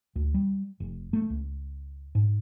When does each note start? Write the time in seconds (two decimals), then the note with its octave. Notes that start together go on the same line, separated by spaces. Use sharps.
0.16 D2
0.34 G3
0.80 F1
1.13 A3
1.30 C#2
2.15 G#2